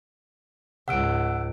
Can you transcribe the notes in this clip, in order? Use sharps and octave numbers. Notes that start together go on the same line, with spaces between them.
C#2 G#2 F#5 E6 D7